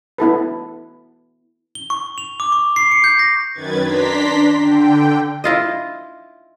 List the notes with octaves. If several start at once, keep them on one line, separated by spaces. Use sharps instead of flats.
B3 E4 A4 B4
G7
C#6
F7
D6
C#6
C7
C#7
G6
A#6
F#2 D#3 B4 G#6 A6
D4 A#5 C6 B6
D3 G5
E4 F4 D#5